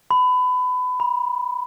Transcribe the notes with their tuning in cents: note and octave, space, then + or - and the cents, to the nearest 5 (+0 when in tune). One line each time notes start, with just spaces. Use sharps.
B5 +25
B5 -30